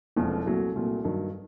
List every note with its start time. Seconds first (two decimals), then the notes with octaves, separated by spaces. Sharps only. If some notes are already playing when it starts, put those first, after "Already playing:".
0.16 E1 E2 C3 F3 A3
0.46 C2 A#2 F#3 A3
0.75 C2 A#2 F#3 A3
1.04 G2 D#3 F#3